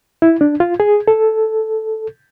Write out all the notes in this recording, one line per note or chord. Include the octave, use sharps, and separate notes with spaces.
E4
D4
F4
G#4
A4